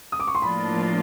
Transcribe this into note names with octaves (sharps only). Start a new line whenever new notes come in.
D#6
D6
C#6
C6
A2 F3 A#3 D4 F4 B5